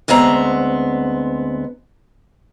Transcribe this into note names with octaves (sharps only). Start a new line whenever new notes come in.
D2 G#3 B3 C4 A#5